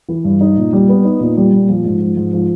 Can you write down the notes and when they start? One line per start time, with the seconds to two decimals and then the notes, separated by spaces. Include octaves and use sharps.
0.09 E3
0.25 G2
0.41 D#4
0.57 A#2
0.73 G3
0.89 B3
1.04 D#4
1.20 A#2
1.37 G3
1.53 A#2
1.69 F3
1.85 G#2
2.01 F3
2.17 G#2
2.33 F3